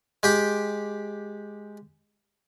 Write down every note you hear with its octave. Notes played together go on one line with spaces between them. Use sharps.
G#3 G4 G5